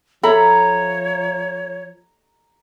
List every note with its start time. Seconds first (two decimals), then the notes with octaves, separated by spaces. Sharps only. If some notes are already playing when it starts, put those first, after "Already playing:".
0.23 F3 A4 C#5 E5 A#5 B5